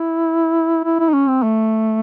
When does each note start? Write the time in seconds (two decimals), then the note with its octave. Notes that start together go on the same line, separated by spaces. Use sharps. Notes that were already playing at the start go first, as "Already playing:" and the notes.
Already playing: E4
0.84 E4
1.00 E4
1.09 D#4
1.14 C#4
1.29 C4
1.43 A3